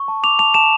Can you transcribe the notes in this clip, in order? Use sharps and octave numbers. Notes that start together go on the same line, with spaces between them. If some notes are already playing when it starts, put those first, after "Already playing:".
Already playing: C#6
A5
D6 F7
A5 F7
A5 E7